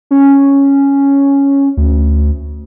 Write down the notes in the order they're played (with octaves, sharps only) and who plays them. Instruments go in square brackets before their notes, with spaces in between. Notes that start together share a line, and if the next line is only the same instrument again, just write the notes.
[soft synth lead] C#4
[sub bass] D2